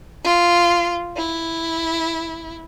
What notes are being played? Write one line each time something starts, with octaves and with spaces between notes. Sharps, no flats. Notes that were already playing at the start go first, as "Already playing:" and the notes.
F4
E4